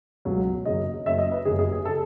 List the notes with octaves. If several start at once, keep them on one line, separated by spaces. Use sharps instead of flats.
C#2 B2 F#3
F#1 F#2 C#3 D#5
F#1 F#2 C#3 E5
D#5
B4
F#1 F#2 C#3 G#4
G#4
G#4
C#3 A4